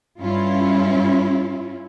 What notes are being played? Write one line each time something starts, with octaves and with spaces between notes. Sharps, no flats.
G2 C#4 E4 F4